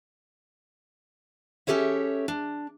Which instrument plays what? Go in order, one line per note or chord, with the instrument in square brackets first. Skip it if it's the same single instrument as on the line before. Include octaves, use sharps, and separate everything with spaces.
[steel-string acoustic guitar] C#4 D4 G4 A4 C#5 E5
D4